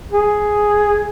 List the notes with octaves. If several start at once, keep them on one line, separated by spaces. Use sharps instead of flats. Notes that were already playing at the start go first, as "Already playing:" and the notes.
G#4